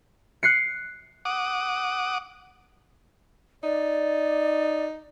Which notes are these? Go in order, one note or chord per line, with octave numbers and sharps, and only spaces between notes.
F#6 C7 C#7
F#5 D6 D#6
D#4 D5